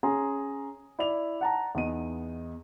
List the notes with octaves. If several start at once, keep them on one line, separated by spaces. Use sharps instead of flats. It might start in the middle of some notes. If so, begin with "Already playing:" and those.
C#4 G#4 A#5 C6
E4 D5 F7
F#5 A5 A#5
E2 B3 D#4 D#7